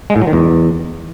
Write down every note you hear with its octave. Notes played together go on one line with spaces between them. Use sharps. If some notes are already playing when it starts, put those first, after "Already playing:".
G#3
A2
F#3
D#3
E2